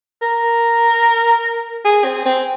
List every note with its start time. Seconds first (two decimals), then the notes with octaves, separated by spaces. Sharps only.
0.22 A#4
1.84 G#4
2.04 C4
2.25 C4